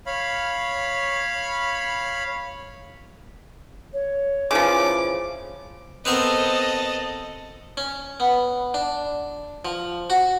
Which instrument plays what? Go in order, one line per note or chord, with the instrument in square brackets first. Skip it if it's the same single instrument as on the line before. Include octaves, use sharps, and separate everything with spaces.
[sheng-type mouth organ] C#5 F5 B5
[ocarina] C#5
[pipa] C#3 E3 F3 [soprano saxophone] D6
[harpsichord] B3 C4 A#4 [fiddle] A4 D#5
[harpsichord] C#4
B3
D4
F3
F#4